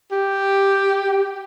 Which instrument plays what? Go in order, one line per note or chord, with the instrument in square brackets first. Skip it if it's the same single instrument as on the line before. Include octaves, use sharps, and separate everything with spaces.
[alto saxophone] G4